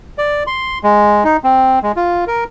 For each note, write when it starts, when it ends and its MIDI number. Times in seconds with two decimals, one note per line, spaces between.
0.18 0.43 74
0.47 0.79 84
0.83 1.24 56
1.24 1.37 63
1.44 1.79 60
1.83 1.92 56
1.96 2.25 65
2.27 2.44 70